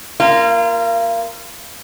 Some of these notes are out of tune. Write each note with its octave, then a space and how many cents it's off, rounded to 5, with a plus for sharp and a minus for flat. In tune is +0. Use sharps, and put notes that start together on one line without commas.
A#3 +0 F4 -30